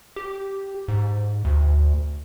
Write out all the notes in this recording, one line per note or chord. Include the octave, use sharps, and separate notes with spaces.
G4
G#2
D2